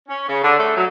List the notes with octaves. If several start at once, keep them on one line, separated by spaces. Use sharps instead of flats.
C#4
C#3
D3
A3
F#3